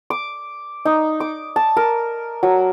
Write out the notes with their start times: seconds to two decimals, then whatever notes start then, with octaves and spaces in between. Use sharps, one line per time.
0.10 D6
0.85 D#4
1.20 D6
1.56 A5
1.77 A#4
2.43 F#3